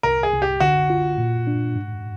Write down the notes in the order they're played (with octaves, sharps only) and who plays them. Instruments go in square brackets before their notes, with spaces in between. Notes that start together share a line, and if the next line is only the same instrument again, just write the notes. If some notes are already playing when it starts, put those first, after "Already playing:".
[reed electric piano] C2 [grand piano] A#4
[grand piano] G#4
[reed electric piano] C2
[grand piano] G4
[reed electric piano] D3 [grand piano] F#4
[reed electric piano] F4
A#2
D4
G#2